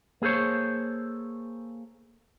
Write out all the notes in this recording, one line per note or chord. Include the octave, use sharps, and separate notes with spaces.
A#3 G#4 A4 C5 C#5